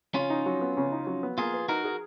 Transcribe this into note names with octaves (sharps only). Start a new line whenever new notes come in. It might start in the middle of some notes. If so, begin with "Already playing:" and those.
C#3 C#4 F4
D#4
F#3
B3
C#3
D#4
F#3
B3
A#3 F4 G#4
B4
D#4 F#4 A#4
G#4